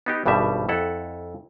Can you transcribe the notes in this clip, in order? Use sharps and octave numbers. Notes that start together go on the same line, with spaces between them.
B3 D#4 G4
G#1 G2 B2 G3 E5
F2 E4 A4 F#5